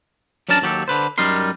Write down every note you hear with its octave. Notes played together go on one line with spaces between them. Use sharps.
F#2 C#4 D4 A#4 A5
D#2 F#3 G4 A4
D3 B4 C5
F#2 G3 D#4 A#4 C6